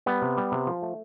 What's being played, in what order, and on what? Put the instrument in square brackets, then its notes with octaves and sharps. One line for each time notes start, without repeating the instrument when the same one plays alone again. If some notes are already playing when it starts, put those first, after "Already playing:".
[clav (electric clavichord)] G3 B3
C3
G3
C3
F3
A3